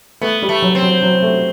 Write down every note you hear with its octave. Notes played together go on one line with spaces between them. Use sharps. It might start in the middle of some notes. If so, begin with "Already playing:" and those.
A3 B3
G3
A3
F#3
C4
F#3
F#3
A3